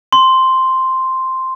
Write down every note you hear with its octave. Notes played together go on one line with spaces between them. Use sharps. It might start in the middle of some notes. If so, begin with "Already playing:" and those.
C6